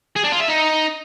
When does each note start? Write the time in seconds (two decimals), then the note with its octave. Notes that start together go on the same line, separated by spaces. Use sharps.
0.16 G#4
0.24 D4
0.32 F4
0.40 E5
0.48 D#4